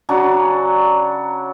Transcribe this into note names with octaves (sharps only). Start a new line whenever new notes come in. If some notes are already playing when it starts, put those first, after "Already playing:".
C#3 F#3 D4